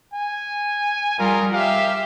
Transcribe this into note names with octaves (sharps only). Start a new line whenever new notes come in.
G#5
G3 F4 G#4 A#4
G4 E5 F5